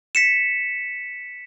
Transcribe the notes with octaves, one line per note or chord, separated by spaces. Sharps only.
B6 C#7 E7